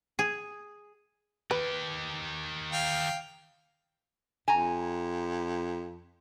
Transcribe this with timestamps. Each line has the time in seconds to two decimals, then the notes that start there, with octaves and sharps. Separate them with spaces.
0.19 G#4
1.51 D#3 G4 B4
2.72 F5 G5
4.48 F2 G#5 A#5